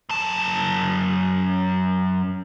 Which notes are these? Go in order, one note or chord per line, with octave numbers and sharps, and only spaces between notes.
F#2 A5